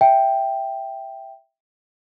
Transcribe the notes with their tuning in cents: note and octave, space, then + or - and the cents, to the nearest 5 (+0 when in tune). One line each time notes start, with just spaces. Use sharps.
E5 +0 G5 +0